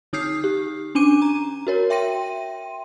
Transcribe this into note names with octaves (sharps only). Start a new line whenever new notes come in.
D3 D#4 D#6 F6 G6 C7
G4
C#4 D4 G#5 D6 D#7
A#5
F#4 A#4 C#5
E5 G5 C6 A#6 D#7